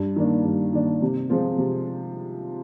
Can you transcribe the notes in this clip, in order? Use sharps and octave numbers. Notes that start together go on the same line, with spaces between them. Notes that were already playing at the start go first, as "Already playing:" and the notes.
Already playing: G2
D#3 A#3 D4
G2
D#3 A#3 D4
C3
F3 G#3 C4 F4
C3